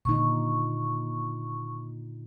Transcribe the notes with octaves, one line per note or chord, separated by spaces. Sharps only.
A#2 D3 D#4 C#6